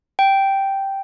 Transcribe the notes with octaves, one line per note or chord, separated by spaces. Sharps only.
G5